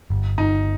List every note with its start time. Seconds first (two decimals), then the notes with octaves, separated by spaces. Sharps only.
0.10 G1
0.38 G1 D#4